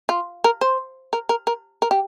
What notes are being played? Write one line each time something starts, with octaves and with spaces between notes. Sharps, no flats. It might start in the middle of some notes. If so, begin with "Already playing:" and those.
F4
A#4
C5
A#4
A#4
A#4
A#4
G4